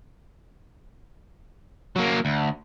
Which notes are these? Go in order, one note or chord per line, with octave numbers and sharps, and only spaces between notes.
F#3 A#3
D2